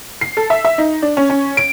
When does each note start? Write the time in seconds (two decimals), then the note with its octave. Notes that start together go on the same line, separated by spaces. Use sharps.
0.21 C7
0.37 A4
0.50 E5
0.65 E5
0.78 D#4
1.02 D4
1.17 C#4
1.30 C#4
1.57 D7